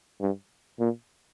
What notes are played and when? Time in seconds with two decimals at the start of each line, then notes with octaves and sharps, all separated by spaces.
0.21 G2
0.80 A#2